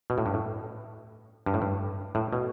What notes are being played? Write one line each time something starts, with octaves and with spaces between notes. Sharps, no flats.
B2
A2
G2
A2
G2
A2
G2
A2
B2